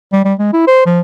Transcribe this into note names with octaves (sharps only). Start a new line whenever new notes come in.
G3
G3
G#3
E4
C5
F3